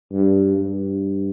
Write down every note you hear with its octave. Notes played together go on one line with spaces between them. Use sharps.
G2
G2